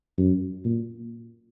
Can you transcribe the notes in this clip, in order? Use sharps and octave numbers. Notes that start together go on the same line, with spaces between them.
F#2
A#2